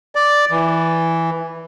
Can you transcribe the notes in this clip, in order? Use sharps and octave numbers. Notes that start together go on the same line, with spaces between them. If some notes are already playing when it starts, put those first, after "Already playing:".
D5
E3